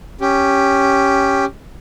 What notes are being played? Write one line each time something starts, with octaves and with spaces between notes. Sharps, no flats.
C#4 G4